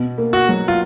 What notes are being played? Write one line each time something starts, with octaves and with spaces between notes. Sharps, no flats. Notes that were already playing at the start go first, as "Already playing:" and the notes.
Already playing: B2
A#3
F#4
F#3
F4